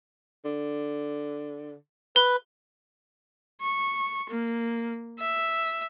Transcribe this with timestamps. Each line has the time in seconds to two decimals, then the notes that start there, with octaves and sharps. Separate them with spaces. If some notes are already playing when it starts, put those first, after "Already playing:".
0.45 D3
2.16 B4 G7
3.61 C#6
4.30 A#3
5.20 E5